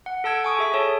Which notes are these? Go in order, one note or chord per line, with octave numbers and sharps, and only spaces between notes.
F#5
A4 A5 E6 G#6 D7
G#5 C#6 D#6
G#4 E5 G#5
A4 C#5 A5